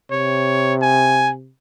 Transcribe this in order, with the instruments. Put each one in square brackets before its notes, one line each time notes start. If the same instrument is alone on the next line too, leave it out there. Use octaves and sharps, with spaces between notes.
[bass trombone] C3 [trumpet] C#5
[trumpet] G#5